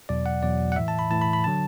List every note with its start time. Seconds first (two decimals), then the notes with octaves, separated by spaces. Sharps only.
0.09 E2 B2 F#3 D5
0.26 F#5
0.43 E2 B2 F#3 D5
0.72 F#5
0.76 A2 E3 E5
0.88 A5
0.99 B5
1.11 A2 E3 A5
1.22 B5
1.33 B5
1.44 D3 F#3 A5